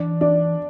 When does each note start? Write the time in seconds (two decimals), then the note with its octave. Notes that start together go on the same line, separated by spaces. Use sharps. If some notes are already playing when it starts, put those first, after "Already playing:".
Already playing: E3 D4
0.21 D4